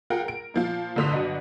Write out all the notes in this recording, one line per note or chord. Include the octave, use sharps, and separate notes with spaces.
F4 G#4 A#4 F#5 G5
A#4 D7
A#2 F3 F4
G1 A2 D3 C6 D#6 B6
G1 F#3 D4 F#4 D#5 D#7